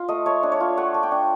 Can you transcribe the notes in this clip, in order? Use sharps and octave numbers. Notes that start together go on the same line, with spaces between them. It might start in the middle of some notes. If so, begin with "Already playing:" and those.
Already playing: F4
A3 D#5
A3 C#5
D4
C#5
F4
A3 F#5
A3
G5
D4